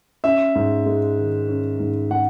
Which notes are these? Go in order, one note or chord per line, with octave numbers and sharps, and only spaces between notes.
C#4 E5
G#2
G#3
D#3
C#4
G#2
G#3 F#5